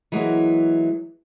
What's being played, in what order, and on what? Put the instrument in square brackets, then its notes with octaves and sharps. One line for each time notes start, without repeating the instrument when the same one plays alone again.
[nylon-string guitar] E3 F#3 G#3 A#3